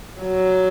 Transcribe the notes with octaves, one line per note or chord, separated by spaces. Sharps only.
F#3